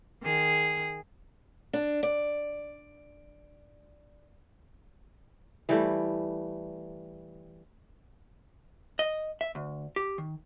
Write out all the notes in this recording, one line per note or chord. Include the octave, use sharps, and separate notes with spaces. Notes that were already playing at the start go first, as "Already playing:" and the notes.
D#3 G#4
D4
D5
E3 G3 A3
D#5
E5
D2
G4
D#3